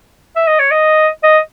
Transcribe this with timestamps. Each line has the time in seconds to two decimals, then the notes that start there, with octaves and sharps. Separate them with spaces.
0.36 E5
0.48 D#5
0.60 C#5
0.71 D#5
1.23 D#5